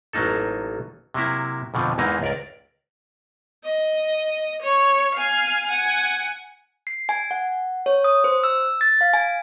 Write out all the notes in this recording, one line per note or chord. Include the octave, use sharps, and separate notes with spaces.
A1 F#3 A#3 D#4 A4
C3 F#3 A#3 E4
F2 B2 D3 F3
E2 G#2 E3 A#3 D#4
C#2 A#4 D5
D#5
C#5
F5 G#5
F#5 G#5
C7
G#5
F#5
C#5
D#6
C5
E6
A6
F5
G#5